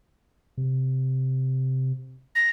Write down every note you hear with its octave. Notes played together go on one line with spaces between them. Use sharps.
C3
A#6